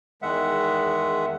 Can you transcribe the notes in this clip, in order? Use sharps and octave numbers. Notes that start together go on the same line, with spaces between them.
E2 D#3 G#3 E5 F#5